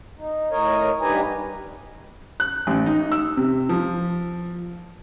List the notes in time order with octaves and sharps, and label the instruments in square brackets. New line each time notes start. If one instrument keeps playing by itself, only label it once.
[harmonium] D#4
A2 A#4 C#5 D#5
G2 D#4 G4 B4 G#5 A#5
[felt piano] F#6
A1
D#4
E6
C3
F3